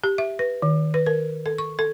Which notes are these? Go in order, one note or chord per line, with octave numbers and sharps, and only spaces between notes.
G4
E5
B4
D#3
B4
A#4
A4
C#6
A4